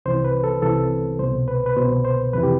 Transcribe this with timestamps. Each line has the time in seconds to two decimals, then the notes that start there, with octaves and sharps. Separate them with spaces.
0.06 C2 C3 E3 C5
0.24 B4
0.44 A4
0.62 C2 C3 E3 A4
1.19 C2 B2 C5
1.48 B4
1.66 B4
1.76 C2 B2 C5
2.05 C5
2.33 F2 C3 E3 B4
2.43 G4